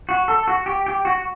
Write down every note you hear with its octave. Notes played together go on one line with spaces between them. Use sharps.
F#4
A4
F#4
G4
G4
F#4